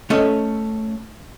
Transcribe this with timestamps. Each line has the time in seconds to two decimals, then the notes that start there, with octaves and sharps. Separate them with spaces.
0.10 A3 C#4 D#5